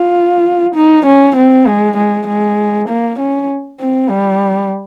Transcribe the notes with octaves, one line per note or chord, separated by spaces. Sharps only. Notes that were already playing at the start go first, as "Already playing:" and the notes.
Already playing: F4
D#4
C#4
C4
G#3
G#3
G#3
A#3
C#4
C4
G3